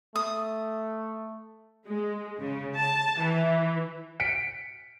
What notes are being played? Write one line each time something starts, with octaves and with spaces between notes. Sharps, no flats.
A3 D#6
G#3
C#3
A5
E3
B6 C#7 D7